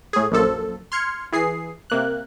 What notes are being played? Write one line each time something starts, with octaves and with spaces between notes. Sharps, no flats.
A2 G#4
A#1 F#2 F3 A4
C6 F6 G#6 C#7
E3 G#4 C7
C3 A#3 F#6